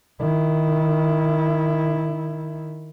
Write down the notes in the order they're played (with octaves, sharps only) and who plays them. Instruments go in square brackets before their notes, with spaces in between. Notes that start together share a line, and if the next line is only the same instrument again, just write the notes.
[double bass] D#3 E4